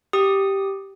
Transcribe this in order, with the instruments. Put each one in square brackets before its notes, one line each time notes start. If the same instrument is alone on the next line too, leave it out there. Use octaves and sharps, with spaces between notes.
[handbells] G4 D#6